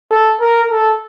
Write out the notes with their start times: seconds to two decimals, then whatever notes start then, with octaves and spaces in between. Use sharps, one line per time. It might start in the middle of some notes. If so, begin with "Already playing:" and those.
0.11 A4
0.40 A#4
0.70 A4